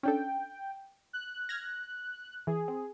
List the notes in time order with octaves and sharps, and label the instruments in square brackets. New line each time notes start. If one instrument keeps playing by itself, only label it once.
[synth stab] C#4 D4 A4 [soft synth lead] G5
[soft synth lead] F#6
[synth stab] F6 G#6 A#6
[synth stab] E3 [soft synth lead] G#4
[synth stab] C4